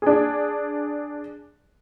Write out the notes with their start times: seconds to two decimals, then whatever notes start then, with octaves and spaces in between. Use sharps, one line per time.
0.02 D4 G#4